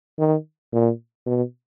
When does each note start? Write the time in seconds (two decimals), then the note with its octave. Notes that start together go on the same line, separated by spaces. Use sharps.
0.19 D#3
0.73 A#2
1.26 B2